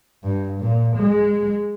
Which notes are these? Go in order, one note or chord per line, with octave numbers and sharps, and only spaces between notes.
G2
A#2
G#3